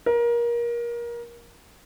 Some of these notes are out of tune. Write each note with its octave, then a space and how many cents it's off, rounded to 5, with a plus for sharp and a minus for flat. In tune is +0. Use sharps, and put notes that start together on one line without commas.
A#4 +25